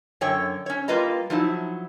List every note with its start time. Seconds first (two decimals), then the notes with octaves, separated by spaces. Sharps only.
0.21 F#2 D3 C#5 G5
0.66 C#4 C#5
0.88 G3 A#3 F4 B4 D#5 A#5
1.30 F3 F#3 D#4 E4